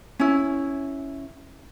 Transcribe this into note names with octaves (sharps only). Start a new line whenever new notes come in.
C#4 E4